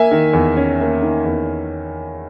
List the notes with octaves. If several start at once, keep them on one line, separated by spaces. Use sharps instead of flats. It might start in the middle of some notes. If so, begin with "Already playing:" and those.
Already playing: A#3 E5 G#5
D#3
E2
C#4
A#3
D#3
E2